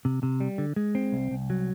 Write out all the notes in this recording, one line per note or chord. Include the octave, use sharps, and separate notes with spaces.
C3
C3
G3
D3
G#3
C4
C2
C2
F#3